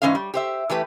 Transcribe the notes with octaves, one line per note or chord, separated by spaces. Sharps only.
G#2 E3 C#4 C5 F5
G3
G4 C5 E5
E3 A3 G4 B4